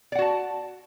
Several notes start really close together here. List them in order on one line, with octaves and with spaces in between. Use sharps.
D5 F#5 F#4 A5